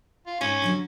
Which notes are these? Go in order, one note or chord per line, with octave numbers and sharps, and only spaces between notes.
F4
G#2 C#4 D#4 D5
D3 F3 F#3